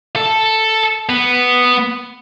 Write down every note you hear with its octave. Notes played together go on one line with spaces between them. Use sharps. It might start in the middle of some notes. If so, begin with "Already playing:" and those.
A4
B3